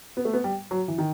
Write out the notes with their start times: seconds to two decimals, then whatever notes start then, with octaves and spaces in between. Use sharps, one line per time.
0.17 B3
0.25 A3
0.33 B3
0.44 G3
0.71 F#3
0.88 E3
0.98 D#3